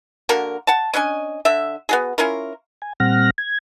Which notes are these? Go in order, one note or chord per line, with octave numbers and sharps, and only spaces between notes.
D3 A#3 F#4 A#4
F#5 A5
C#4 D4 D#5 G#5
D3 E5
B3 F#4 G#4
C#4 E4 F4 A#4
G#5
A#2 G3 C4 F#5 F6 A#6
G#6